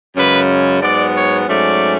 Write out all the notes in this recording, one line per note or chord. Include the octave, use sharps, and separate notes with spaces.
F#2 C#3 G#3 C#4 B4
G#2 F#3 B3 D5
C#5
G#2 F#3 A3 C#4 D5